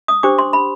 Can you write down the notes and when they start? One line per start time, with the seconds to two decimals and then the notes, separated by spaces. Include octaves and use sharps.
0.08 D#6
0.23 D4 G4 C5 D6
0.39 C6
0.53 B5